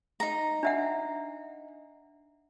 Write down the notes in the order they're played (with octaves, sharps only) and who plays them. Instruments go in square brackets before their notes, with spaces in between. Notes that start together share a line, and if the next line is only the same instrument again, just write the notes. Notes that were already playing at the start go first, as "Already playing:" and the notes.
[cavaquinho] D#4 A#5
[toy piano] D4 E5 F#5